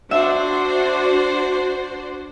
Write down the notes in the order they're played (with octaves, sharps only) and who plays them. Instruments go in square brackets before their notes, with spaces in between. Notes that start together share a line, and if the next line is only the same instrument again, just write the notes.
[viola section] D4 F#4 C5 [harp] E5